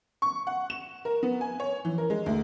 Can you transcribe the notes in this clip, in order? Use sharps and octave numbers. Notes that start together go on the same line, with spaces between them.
C#6
F#5
E7
A#4
B3
G#5
C#5
E3
A#4
G#3
D2